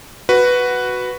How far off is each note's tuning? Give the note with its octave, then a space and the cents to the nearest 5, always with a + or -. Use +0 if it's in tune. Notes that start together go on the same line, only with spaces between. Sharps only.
F#4 +0 B4 +0